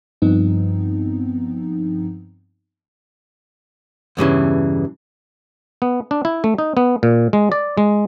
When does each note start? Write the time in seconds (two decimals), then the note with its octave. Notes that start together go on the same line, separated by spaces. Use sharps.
0.22 G2 F3 B3 C4 D#4
4.17 E2 G2 C#3 E3
5.82 B3
6.11 D4
6.25 E4
6.44 A3
6.58 D#4
6.77 B3
7.03 A#2
7.33 G#3
7.52 D5
7.78 G#3